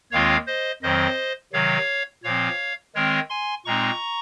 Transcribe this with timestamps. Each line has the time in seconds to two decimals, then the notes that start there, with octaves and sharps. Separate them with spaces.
0.11 D#2 D#3 G#3 C4 F4 C#5 F5
0.47 C5 D#5
0.83 F2 D#3 F#3 C4 C5 D#5
1.53 C3 D#3 F#3 C#5 F5
2.24 A#2 F3 C4 C#5 F5
2.95 D#3 G#3 C4 A#4 C#5
3.30 G#5 C6
3.65 A#2 G#3 C4 D#4 A#5 C#6